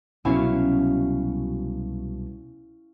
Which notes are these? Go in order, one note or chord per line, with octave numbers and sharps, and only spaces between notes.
C2 B2 F#3 C#4 E4 F5